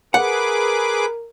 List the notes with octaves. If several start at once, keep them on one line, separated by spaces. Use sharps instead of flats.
G#4 A#4 B4 F#5 D6